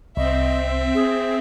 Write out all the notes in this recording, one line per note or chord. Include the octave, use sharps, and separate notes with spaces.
C2 C4 D#5 E5
G#4